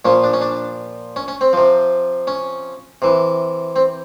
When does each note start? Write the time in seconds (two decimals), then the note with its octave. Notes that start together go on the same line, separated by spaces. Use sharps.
0.05 A#2 F3 C#4
0.24 D4
0.33 C#4
0.41 D4
1.16 C#4
1.28 C#4
1.41 C4
1.53 C3 F3
2.27 C#4
3.02 C3 E3
3.76 C4